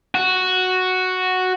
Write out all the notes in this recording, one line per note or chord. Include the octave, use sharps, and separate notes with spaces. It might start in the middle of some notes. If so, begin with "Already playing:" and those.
F#4